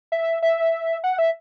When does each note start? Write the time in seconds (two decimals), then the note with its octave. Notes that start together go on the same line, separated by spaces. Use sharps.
0.12 E5
0.42 E5
1.04 F#5
1.19 E5